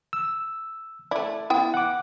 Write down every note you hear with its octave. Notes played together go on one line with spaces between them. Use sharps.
E6
A3 E4 D5
B3 E4 G5
F#5 D6